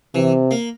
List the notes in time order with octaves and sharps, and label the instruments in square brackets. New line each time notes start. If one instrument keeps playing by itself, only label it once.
[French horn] C3 [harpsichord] E3
[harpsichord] A#3